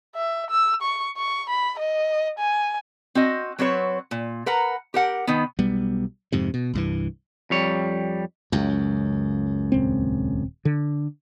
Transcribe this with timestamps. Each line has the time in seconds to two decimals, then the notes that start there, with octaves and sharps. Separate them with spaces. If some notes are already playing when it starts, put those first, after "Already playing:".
0.15 E5
0.50 E6
0.82 C#6
1.17 C#6
1.50 B5
1.79 D#5
2.39 G#5
3.15 C4 F#4 D#5
3.59 F#3 C4 B4 C#5
4.11 A#2
4.46 A#4 B4 F#5 A#5
4.94 G4 A#4 F#5
5.27 D#3 B3
5.59 B1 G3 B3
6.32 F2 G#2 C3
6.54 B2
6.74 C2 G2 E3
7.50 F2 G3 C#5
8.52 C#2 F#2
9.72 D#1 C4
10.65 D3